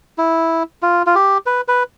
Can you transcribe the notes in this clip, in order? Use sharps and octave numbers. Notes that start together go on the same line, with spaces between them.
E4
F4
F4
G4
B4
B4